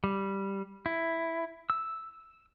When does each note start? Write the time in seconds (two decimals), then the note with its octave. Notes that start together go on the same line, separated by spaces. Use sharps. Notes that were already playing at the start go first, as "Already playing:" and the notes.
0.04 G3
0.86 E4
1.70 E6